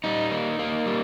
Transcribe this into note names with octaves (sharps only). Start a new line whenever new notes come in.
G3 D#4
A#3
A#3
G3